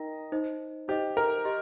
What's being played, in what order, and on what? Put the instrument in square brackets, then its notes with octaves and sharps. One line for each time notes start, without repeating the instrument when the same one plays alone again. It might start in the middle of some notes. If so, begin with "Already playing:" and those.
Already playing: [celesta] D#4 A#4 G5 A#5 [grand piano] D#5
[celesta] D#4 C5 D#5
[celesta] D#4 C5 D#5 [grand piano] G4
[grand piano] A#4
[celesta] G4 D#5 C6